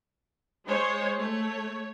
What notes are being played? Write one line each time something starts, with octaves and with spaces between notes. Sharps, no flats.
G#3 C5 C#5
A3 C#5